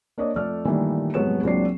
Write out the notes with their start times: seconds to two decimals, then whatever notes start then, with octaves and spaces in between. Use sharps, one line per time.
0.18 A#3 D4 C#5 D#5
0.36 F2 A3 D5 F6
0.65 G2 A#2 D#3 E3 G3 A3
1.14 F1 G#2 F#3 B3 C#5 E7
1.43 C#2 A#2 F#3 C4 D4 C7